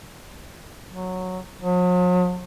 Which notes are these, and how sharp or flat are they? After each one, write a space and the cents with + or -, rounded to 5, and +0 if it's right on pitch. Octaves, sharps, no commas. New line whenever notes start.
F#3 -10
F#3 -45